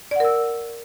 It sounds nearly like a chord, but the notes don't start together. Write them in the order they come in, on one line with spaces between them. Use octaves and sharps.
D5 F#5 A#4 E6